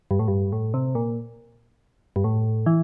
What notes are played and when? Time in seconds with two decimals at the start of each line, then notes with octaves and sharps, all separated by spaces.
0.11 G2
0.19 A2
0.28 G2
0.52 A2
0.74 C3
0.95 A#2
2.16 G2
2.24 A2
2.66 E3